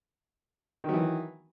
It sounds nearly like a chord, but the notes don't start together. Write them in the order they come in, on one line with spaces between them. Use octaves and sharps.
D#3 F#3 E3